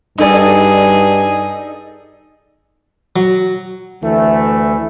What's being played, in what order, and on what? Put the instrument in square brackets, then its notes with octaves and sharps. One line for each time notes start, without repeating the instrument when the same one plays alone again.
[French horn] G2 [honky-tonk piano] D#4 A4 D5 [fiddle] G#4
[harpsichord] F#3
[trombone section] D2 E3 A3